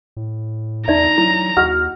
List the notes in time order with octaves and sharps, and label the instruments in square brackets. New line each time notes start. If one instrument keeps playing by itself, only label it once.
[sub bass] A2
[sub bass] E2 [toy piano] D#4 D5 E5 [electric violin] A#5
[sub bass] F#3 [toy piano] E4
[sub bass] D#2 [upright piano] F#4 F6